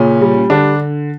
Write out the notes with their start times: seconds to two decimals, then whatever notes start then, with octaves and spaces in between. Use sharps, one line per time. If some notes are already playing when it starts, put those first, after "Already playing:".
Already playing: A#2 C#3 C#4
0.21 G3
0.50 D3 D4